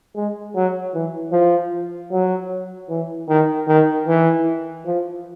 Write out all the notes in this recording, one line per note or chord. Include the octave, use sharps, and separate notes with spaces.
G#3
F#3
E3
F3
F#3
E3
D#3
D#3
E3
F3